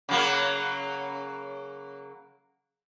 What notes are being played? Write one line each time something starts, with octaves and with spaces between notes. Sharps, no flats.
C#3 F#3 A#3